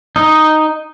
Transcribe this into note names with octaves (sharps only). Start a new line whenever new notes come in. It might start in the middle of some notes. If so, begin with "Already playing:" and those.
D#4